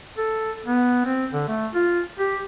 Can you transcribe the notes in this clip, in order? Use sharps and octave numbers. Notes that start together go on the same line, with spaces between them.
A4
B3
C4
D3
A3
F4
G4